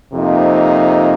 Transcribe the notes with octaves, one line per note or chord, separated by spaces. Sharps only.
F2 C3 F3 A#3 D#4